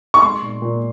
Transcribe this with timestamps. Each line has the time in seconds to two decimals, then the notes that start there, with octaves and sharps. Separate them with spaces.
0.14 C#6
0.22 G#3 C6
0.42 A#2
0.62 A#2